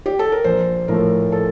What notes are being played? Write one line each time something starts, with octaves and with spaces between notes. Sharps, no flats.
G4
A4
A#4
A#1 C5
A2 F3 A3 A#4
A4